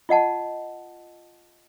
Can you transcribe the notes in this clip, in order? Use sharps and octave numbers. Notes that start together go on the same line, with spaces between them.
F4 D#5 F#5 A5